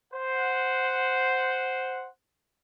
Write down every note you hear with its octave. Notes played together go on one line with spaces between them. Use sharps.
C5 F#5